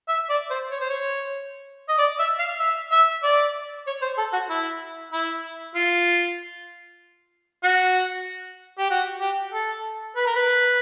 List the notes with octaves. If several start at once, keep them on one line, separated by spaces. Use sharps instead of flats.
E5
D5
C5
C#5
C5
C#5
D#5
D5
E5
F5
E5
E5
D5
C#5
C5
A4
F#4
E4
E4
F4
F#4
G4
F#4
G4
A4
B4
A#4
B4